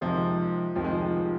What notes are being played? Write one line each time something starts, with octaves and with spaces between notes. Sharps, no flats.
F2 C3 D#3 F3 G#3 C4
F1 F2 D#3 F3 C4
G#3
F3